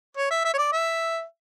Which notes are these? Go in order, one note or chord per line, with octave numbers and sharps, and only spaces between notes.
C#5
E5
E5
C#5
D5
E5